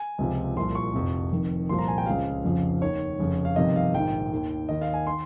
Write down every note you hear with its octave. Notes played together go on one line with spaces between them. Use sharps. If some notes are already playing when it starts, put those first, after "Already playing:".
Already playing: G#5
C#2 C3 F3
C2 A#2 F3 C6
C#6
F1 F2 C3 F3
F1 F2 D#3
C2 A#2 F3 C6
A#5
G#5
G5
C#2 C#3 F3 F5
F1 F2 C#3 F3
D#2 D#3 C#5
F1 F2 C#3
F5
G1 F2 C3 D#3 D#5
F5
A#1 G#2 D#3 G5
D#2 D#3
D#2 D#3 D#5
F5
G#5
D#3 C6